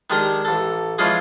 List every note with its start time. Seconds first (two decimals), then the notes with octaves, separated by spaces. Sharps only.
0.10 D#3 G#3 D4 G4 G#4 A#4
0.45 A1 A4
0.98 E3 F3 G#3 C#4 F4 G#4